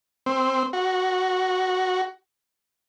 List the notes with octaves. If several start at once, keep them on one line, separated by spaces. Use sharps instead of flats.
C4
F#4